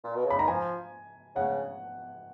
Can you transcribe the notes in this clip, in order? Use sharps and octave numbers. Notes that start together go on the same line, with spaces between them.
A#2
B2
C#3
B5
D#3 A#5
F3 G#5
C#3 F#5